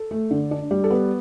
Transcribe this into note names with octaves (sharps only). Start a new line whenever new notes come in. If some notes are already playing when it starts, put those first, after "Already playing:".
Already playing: A4
A3
D3
D4
G3
A4
B3 B4